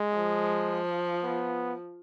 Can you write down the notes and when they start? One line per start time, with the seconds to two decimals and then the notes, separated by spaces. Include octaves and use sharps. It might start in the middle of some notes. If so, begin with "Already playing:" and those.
Already playing: G#3
0.16 F3
1.23 B3